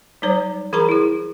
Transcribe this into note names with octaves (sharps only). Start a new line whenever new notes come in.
F#3 G3 D#4 C5 C#5
E3 G#4 A#4 A#5 B5 C#6
E4 G#4